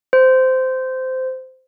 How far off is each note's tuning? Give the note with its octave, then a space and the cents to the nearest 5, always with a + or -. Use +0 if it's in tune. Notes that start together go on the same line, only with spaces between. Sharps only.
C5 -15